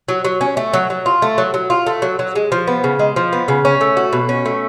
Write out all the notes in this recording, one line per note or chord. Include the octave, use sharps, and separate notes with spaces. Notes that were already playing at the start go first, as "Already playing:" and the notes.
F#3
F#3
C#4
A3
F#3
F#3
F4
A3
F#3
F#3
F4
A3
F#3
F#3
G#3
F3
B3
C#3
G#3
F3
B3
C#3
C#4
A3
F#4
B2
C#4
A3